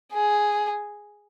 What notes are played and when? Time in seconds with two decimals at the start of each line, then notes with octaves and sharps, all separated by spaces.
0.14 G#4